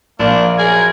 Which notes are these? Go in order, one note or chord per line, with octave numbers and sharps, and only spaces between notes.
A#1 A#3 D4
F#2 G#4 A#4 G#6